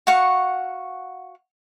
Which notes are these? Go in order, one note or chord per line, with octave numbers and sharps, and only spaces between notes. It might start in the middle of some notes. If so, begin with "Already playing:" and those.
F#4 F5 F#5 C#6